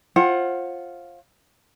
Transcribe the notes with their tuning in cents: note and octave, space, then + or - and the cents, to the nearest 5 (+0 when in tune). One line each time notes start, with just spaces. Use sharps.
F4 +0 C5 +35 F#5 +0